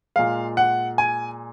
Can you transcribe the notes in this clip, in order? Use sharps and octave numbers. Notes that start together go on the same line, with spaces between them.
A#2 G#3 F5
F#5
G#5